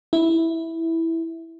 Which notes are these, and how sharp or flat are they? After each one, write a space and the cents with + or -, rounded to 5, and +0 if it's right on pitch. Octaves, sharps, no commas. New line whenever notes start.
E4 -5